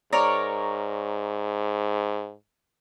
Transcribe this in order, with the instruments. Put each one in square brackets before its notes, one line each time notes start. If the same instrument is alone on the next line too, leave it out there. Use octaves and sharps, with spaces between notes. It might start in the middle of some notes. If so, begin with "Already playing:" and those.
[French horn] G#2 [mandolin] A#4 C#5 D5